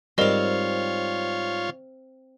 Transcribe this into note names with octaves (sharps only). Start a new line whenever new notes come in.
G#2 G3 C4 F4 A#4 C#5 D#5 F5